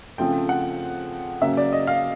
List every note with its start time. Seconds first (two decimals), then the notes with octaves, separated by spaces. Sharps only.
0.18 C#3 F3 A3 C4 G5
0.49 F#5
1.41 C#3 F#3 A#3 E5
1.57 D5
1.73 D#5
1.87 F5